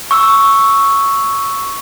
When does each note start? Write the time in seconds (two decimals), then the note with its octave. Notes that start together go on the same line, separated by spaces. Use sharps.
0.11 C#6 E6